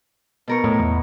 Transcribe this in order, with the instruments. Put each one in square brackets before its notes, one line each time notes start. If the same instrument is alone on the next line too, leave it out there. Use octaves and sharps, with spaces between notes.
[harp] B2 A#4 C#6
[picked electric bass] A2
E2